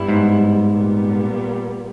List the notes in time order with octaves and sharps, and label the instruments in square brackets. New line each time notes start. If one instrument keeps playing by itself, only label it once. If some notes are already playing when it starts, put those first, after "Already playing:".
Already playing: [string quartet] G2 G3 B3 E4
[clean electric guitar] G#2
[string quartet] A#2 G3 B3